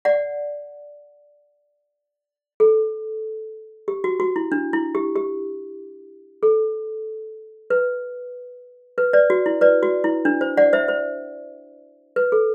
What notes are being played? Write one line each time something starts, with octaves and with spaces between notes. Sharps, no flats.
D5 F#5
A4
G4
F#4
F#4
E4
D4
E4
G4
G4
A4
B4
B4
B4 D5
F#4
E4
B4 D5
F#4
E4
D4
C5
D5 F#5
C5 E5
C5
B4
A4